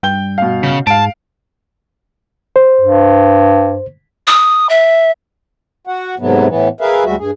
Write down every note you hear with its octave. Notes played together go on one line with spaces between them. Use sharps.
G2 G5 G6 G7
B2 F5
C#3
G#2 F5 A5 D7
C5
G2
D#6
E5
F#4 F#5
G#2 C3 F#3 A3 B3
A2 E3 B3
G#4 A#4 B4 E5 F5
D2 G3 G#3 F#4 E5
G2 G#4